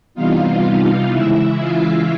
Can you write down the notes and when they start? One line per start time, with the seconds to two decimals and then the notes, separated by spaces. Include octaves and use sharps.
0.14 C3 E3 G3 B3 D#4 F4 F5
1.10 C#3 E3 G#3 E4 E5
1.58 F4 F5